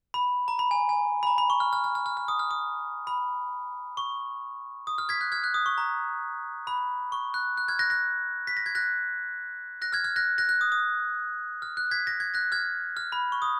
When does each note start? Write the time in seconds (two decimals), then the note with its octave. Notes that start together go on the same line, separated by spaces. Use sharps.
0.14 B5
0.48 A#5
0.59 B5
0.71 G#5
0.89 G#5
1.23 B5
1.27 A#5
1.38 B5
1.50 C#6
1.60 F6
1.73 F6
1.84 F6
1.95 F6
2.06 F6
2.17 F6
2.28 D#6
2.39 F6
2.51 D#6
3.07 B5
3.97 C#6
4.87 D#6
4.98 F6
5.09 G#6 B6
5.21 F#6
5.32 F6 G#6
5.44 F#6
5.54 D#6
5.66 C#6
5.78 A#5
6.67 B5
7.12 C#6
7.34 F#6
7.58 F#6
7.68 F6 G#6
7.79 F#6 A#6
7.90 F#6 A#6
8.47 B6
8.57 A#6
8.66 G#6
8.75 F#6 A#6
9.82 F#6 A#6
9.93 F6 G#6
10.04 F6 G#6
10.16 F#6 A#6
10.38 F#6 A#6
10.49 F#6
10.61 D#6
10.72 D#6
11.62 F6
11.77 F#6
11.91 G#6 B6
12.07 A#6
12.20 G#6
12.34 F#6 A#6
12.52 F6 G#6
12.97 F6
13.12 B5
13.32 C#6
13.42 D#6